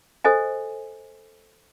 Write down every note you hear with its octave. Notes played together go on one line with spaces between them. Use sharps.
A4 C5 D#5 G#5